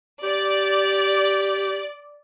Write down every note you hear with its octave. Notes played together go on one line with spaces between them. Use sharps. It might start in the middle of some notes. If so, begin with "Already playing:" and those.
G4 D5